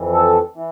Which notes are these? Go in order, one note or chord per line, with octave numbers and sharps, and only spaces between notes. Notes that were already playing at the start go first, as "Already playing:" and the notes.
Already playing: F2 E3
A4
E3